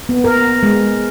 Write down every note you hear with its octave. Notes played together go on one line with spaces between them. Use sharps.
B3
A#4
G#3